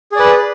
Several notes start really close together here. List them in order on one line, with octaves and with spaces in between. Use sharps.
G#4 D5 B4